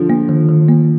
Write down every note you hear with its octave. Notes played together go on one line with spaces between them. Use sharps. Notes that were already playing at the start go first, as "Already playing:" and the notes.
Already playing: D3 F3
A#3
D#3
D#3
A#3